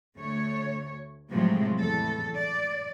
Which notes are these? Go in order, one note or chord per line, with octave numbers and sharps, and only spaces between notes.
D2 A3 C#5
A2 C3 F3 F#3 G#3 A3
E2 A2 A4
D5